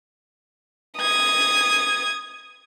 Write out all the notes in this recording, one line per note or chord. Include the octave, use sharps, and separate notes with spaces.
D#6 G#6